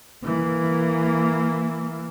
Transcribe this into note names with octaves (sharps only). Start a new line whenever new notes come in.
E3 A#3